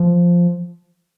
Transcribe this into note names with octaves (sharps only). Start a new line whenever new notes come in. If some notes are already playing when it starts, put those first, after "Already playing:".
Already playing: F3